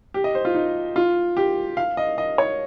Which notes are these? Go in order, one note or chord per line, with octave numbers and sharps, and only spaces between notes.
G4
D#5
C5
F4
D#4
F4
G4
F5
D#5
D#5
C#5